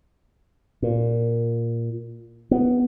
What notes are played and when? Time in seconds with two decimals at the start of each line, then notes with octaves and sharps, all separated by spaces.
0.82 A#2
2.51 B3